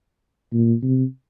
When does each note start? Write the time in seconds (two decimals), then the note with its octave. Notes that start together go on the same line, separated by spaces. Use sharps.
0.53 A#2
0.82 C3